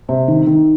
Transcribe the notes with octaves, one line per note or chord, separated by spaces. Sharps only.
C3
D#3
D#3